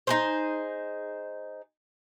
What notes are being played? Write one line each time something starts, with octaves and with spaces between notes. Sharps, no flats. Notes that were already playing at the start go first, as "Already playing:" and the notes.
D#4 G#4 C5